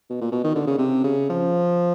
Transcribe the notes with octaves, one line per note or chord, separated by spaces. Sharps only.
B2
A#2
B2
D#3
D3
C#3
C3
C#3
F3